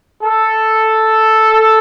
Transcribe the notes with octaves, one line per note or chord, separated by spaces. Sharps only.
A4